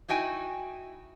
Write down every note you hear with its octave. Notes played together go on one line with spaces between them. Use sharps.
D#4 E4 F#4 G5 G#5